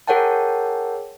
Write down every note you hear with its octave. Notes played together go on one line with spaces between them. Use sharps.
G#4 A#4 C#5 F#5 G5 A5